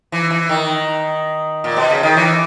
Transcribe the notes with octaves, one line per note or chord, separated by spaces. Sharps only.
E3
E3
D#3
A#2
B2
C#3
D#3
E3